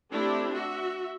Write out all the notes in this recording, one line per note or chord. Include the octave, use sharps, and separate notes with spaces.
A3 C4 D4 E4 G4
F#4 E5